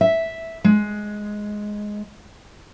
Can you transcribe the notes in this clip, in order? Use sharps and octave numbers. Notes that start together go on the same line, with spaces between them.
E5
G#3